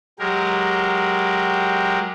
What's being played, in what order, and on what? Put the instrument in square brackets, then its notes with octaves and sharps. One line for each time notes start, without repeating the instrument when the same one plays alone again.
[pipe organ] F#3 G#3 G4 A#4